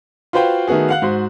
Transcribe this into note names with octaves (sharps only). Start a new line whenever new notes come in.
F4 F#4 B4 C5 F5 G5
D#3 A3 B3 F#4 G#4
F5 F#5 F#6
G#2 F#4 C5